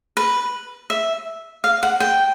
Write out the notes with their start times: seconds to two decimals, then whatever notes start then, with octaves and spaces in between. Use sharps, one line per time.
0.17 B4
0.90 E5
1.64 F5
1.83 F#5
2.00 G5